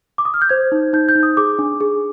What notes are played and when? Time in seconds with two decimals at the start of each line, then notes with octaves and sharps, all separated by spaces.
0.18 D6
0.25 D#6
0.34 F6
0.42 G6
0.49 C5 G#6
0.72 D#4
0.93 D#4 G6
1.09 G6
1.15 D#4
1.23 D#6
1.37 G#4 D6
1.59 D4
1.80 G#4